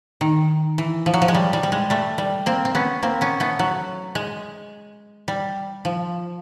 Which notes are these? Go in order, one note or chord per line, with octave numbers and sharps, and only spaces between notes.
D#3
E3
F3
F#3
F3
G#3
G3
G3
G3
G#3
G3 A3
G3
A#3 C4
C4
B3 C#4
A#3 C4
B3 C#4
A3 B3
F#3
G#3
G3
F3